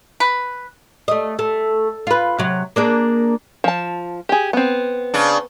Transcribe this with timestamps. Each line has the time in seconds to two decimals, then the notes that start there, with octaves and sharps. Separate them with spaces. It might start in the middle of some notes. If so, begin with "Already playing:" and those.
0.20 B4
1.08 A3 D#5
1.39 A3
2.07 F4 B4
2.38 C3 F#3
2.76 A#3 D4 G#4
3.64 F3 A5
4.29 G4 G#4
4.53 B3 C4
5.14 C#3 D4